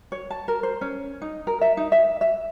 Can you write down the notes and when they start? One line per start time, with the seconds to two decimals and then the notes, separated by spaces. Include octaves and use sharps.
0.12 C#5
0.30 A5
0.48 A#4
0.63 C5
0.81 C#4
1.22 D#4
1.47 A#4
1.61 E5
1.77 D#4
1.92 E5
2.21 E5